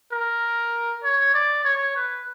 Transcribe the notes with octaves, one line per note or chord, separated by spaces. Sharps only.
A#4
C#5
D5
C#5
B4